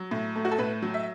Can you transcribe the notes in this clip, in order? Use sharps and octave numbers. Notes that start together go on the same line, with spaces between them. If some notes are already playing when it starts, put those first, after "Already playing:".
Already playing: F#3
A2
A3
F#4
A4
A2 B4
F#3
E5